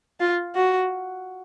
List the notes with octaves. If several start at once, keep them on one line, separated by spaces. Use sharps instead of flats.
F4
F#4